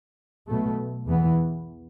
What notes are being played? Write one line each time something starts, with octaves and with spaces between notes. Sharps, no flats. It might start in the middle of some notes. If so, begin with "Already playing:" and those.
B1 B2 A3
E2 E3 B3